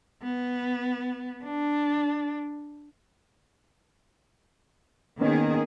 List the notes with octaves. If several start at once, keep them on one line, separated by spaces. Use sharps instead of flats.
B3
D4
D#3 A#3 B3 C#4 G#4